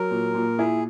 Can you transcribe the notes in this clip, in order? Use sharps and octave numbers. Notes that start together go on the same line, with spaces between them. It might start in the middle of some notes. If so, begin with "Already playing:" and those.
Already playing: F#3 A#4
A#2
A#2
E4 G#4